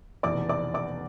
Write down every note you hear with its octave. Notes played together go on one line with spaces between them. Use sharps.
F1 E2 B2 D5 D6
D5 D6
D5 D6